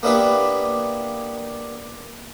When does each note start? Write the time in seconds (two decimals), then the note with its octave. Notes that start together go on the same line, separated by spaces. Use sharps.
0.03 A#3 B3 D4 E4 G4 B4